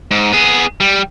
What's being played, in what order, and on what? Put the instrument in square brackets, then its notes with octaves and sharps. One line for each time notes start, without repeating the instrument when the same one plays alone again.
[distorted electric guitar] G#2
B3 G#4
G3